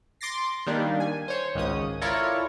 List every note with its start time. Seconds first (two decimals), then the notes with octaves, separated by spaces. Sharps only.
0.21 C6 D6 A6 A#6 C7
0.67 D#3 G3 A#3 D4
1.00 G#5
1.28 C5 C#5
1.55 G#1 C#2 C#4 D#6
2.01 E4 F4 A4 A#4 C#5 D5